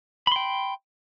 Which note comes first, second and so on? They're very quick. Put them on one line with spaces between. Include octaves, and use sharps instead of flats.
B5 C6 G5